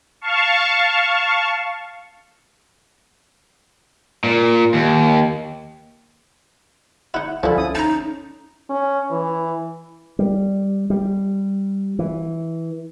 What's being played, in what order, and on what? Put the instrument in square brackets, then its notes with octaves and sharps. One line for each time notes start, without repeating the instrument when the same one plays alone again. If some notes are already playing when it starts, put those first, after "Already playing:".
[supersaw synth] F5 A5 C#6
[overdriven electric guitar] A#2
D#2
[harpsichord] D#4 E4 [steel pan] F#5
[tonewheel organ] D2 F5 G#5 [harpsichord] D3 F3 [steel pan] E4 A4
[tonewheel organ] C#4 [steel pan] D#6
[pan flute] D#4 [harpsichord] A5 A#5
[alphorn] C#4
E3
[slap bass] G3
G3
E3